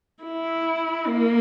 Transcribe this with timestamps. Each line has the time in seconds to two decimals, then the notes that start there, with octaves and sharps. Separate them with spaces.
0.24 E4
1.07 A#3